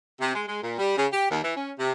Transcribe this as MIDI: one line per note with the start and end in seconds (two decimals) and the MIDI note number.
0.20 0.33 48
0.34 0.43 56
0.47 0.59 56
0.63 0.74 46
0.79 0.94 55
0.96 1.05 49
1.11 1.29 67
1.30 1.40 39
1.43 1.56 52
1.56 1.72 61
1.78 1.92 48